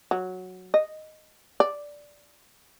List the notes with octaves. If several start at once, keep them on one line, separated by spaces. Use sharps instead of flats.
F#3
D#5
D5